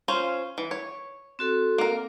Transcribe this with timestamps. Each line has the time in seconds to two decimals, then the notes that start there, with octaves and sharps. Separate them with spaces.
0.08 C#4 F4 C5
0.58 E3
0.71 C#5
1.39 C4 F#4 A4
1.78 A#3 A#4